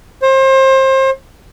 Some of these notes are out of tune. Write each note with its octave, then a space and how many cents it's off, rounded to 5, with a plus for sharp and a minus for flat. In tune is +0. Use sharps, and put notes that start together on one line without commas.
C5 +30